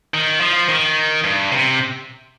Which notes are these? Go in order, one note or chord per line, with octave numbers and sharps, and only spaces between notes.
D#3
F3
D#3
G2
C3